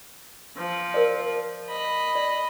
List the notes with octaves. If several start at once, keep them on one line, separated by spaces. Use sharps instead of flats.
F3
A#4 C5 D5
D#5 B5
D5